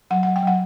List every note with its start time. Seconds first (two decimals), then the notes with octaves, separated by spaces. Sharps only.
0.11 F#3 F#5
0.23 F#5
0.27 F#3
0.36 G5
0.43 F#3 F#5